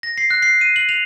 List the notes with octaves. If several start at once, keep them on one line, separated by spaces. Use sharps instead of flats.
A#6
C7
F#6
C7
D#7
F#7
F7